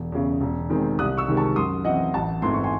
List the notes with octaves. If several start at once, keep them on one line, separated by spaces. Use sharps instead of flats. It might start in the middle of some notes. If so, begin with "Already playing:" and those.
Already playing: E1
E2 C#3
E1
E2 D#3 G#3 C4
C2 D#6 F#6
C#6 E6
C3 D#3 G#3 C4
A5 C#6
F#2 C6 D#6
E3 C4 D#5 F#5
A1 F#5 A5
G#2 E3 A3 C4 C6
C#6
G#5 C6